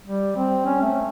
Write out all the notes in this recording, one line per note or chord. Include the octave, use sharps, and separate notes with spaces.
G3
C4
C#4
A3